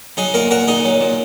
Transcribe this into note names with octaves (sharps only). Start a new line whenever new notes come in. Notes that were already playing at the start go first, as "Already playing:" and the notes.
F#3 D#4 G#4
A#2 F#4 A#4
A#2 F#4 A#4
A#2 D#4 G#4
F#3
A#2